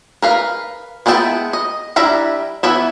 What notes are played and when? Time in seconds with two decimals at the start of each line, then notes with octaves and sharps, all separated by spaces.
0.22 A#4 B4 F5
1.06 G#3 B3 E4 G5 A5
1.53 D#5
1.96 G3 D4 E4 E5 A#5
2.63 E3 B3 E4 E5